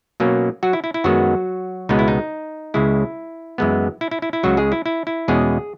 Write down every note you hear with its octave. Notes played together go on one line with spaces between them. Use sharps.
B2 F#3 A#3 C#4
F#3 F#4
E4
E4
E4
F#2 D#3 F#3 G#3 B3 F#4
C#2 B2 G#3 B3 D#4
E4
D#4
C#2 C#3 G#3 E4
F#2 E3 G#3 B3
E4
E4
E4
E4
C#2 C#3 F#3 F#4
G#3 G#4
E4
E4
E4
E2 B2 G#3 C#4 G#4